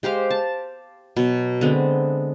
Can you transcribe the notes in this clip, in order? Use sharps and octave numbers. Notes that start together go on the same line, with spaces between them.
G#3 G4 C5 F5
A5
B2 F#3
D3 G#3 B3 C4